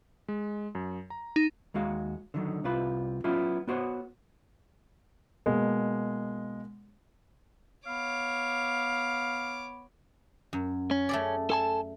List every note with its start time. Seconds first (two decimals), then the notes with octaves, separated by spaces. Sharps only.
0.28 G#3
0.75 F#2
1.10 A#5
1.36 D#4
1.74 D#2 G#3 F#4 F5
2.34 D3 D#3 F#3
2.64 C2 C3 F4 B4 B5
3.24 F#3 B3 C#4 E4 F4
3.68 B3 F#4 C5 C#5
5.46 B2 G#3 A#3
7.87 B3 C#5 F5 D6
10.53 F#2
10.91 C#4
11.09 A3 G#4 D5
11.50 A4 G#5 A5